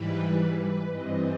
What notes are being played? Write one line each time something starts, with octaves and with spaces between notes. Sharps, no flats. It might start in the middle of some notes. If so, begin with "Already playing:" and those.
Already playing: G#2 E3 G3 B4
B4
G2 E3 G3 C4 D#5